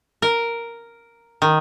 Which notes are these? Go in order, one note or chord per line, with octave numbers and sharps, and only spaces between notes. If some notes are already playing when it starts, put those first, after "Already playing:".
A#4
D#3